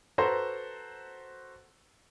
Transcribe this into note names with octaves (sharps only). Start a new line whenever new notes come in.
F#4 A4 B4 C5 A#5 C6